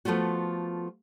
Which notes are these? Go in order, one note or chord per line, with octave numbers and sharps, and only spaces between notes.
F3 A3 B3 F4 F#4